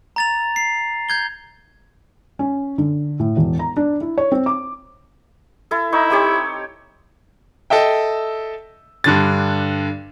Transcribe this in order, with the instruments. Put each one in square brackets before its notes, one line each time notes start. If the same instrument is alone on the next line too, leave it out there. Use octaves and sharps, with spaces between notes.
[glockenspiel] A#5 A6 F7
C7
G6 G#6 G7
[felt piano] C#4
D3
A2
E1
A#5
D4
E4
C#5
C4
D6
[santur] E4 A4
[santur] D#4 C#6 [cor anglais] E4
[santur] C4 G4 C#5
[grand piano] A4 D#5 E5 G5
G2 D3 A6